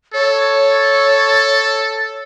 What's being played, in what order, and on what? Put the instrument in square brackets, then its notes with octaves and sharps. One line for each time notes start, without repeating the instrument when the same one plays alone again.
[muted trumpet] A4 [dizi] C#5